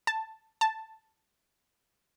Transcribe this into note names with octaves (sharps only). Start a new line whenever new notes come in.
A5
A5